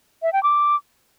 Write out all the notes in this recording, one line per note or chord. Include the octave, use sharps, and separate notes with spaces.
E5
G5
D6